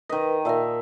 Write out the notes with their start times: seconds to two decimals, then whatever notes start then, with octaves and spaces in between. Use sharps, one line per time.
0.10 D#3 A#4 B4 D#5
0.45 A#2 A#4 E5 A5